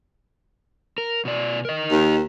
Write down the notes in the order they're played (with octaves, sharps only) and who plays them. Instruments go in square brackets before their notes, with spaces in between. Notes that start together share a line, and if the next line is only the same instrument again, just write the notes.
[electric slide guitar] A#4
B2 D5
A#4 D#5
[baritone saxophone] D#2